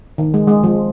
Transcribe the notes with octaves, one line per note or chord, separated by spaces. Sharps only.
D#3
G#3
G#3
F3